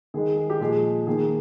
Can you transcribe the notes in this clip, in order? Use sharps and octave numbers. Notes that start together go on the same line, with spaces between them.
D#3 G#3 G#4
G#4
G4
A#2 F3 G#3 G#4
D#3 A#3 G#4